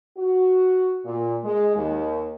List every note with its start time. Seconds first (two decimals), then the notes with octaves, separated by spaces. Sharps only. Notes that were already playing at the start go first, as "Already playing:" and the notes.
0.18 F#4
1.05 A#2
1.44 G#3
1.76 D#2